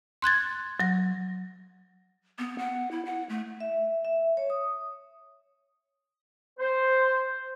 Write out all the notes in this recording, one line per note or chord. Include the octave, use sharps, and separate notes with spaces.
C6 F#6 G#6 A6
F#3 A#6
B3
F#5
E4
F#5
A3
E5
E5
C#5
D#6
C5